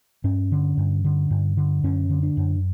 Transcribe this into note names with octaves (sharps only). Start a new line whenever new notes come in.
G2 C#4
D3
G2
D3
G2
D3
F#2 C#4
D3
D4
F#2